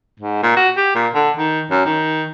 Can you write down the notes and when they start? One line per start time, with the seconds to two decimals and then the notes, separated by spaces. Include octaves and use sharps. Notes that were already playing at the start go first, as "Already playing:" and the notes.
0.20 G#2
0.43 A#2
0.57 F#4
0.77 G4
0.95 A#2
1.15 D3
1.37 D#3
1.71 F#2
1.86 D#3